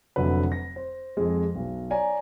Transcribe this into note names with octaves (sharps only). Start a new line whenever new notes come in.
F1 D3 F#3 B4
A#6
C5
F2 G#3
B1 B2
C#5 D5 G#5 A#5